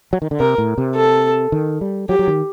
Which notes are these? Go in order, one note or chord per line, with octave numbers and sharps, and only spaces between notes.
F#3
D#3
D3
C3 A#4
A2
C3
A4
D#3
G3
F#3 G4
F#3
D#3